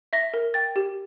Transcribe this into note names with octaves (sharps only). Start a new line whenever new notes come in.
E5 A#6
A#4
G5 A6
G4